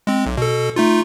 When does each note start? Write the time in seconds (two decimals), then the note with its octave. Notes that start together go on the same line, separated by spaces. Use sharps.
0.07 G#3 C4
0.26 B1
0.38 B2 A4
0.76 A3 D#4 F4